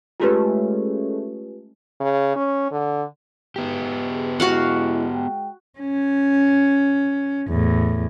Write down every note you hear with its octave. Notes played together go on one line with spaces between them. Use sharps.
G#3 A3 C#4 F4 G4 B4
C#3
C#4
D3
B1 G#2 B3 G4
G#4 B4
G#3 C#4 E4 F#4 F5 F#5
G#3 G5
C#4
E2 A2